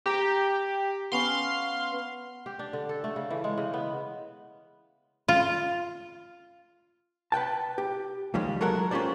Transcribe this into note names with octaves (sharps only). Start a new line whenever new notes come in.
G4 A#5 D6
B3 C#4 F5 C6
G4
D4
D3
A4
A3
C#3
E3
G#3
C#3
B3
F4
B4 F#5 G5 A5
G4
C#2 D#3 F3 G3 G#3
F#3 G#3 F#4 A4 A#4 F#5
C#4 F4 G4 C5 D5